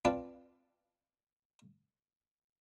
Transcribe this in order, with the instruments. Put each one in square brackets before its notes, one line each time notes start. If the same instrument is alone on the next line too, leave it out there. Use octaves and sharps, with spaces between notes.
[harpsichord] C4 F4 B4 D5 A5